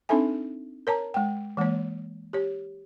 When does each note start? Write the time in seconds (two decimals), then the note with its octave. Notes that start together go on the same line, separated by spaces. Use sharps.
0.09 C4 D4 D#4 A4 E5 G#5
0.87 A#4 C#5 A5 A#5
1.14 G#3 G5
1.57 E3 G#3 A#3 C#5
2.33 G4 C#5